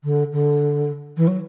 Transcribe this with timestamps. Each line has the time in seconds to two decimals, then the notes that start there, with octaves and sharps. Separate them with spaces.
0.04 D3
0.32 D3
1.17 E3
1.27 F#3